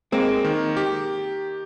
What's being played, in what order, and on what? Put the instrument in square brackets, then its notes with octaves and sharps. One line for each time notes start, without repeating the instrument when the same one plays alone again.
[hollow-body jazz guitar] G#3 C4 [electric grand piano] A#3
[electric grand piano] D#3
G4